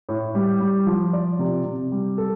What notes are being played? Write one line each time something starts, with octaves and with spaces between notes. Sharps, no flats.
A2
G3
G3
F3
D5
C3
C3
G3
A4